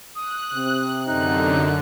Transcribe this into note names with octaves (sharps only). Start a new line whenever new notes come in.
D#6 F#6
C3 C4
F#2 D3 D#4 F#6